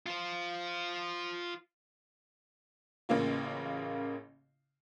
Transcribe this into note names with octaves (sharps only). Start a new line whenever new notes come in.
F4 C5
A1 C#3 A#3 F4